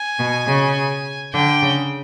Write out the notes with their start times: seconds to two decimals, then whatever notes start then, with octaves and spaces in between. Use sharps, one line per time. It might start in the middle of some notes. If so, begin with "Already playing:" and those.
Already playing: G#5
0.19 B2
0.47 C#3
1.33 D3 G5
1.63 C#3